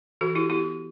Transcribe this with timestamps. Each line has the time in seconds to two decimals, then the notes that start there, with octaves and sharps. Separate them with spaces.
0.21 E3 F#4 A4
0.35 E4 G4
0.50 B3 E4 G4